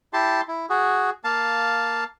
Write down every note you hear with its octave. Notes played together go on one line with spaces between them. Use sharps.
E4 G4 A5 C6
E4
F#4 G#4
A#3 F5 A5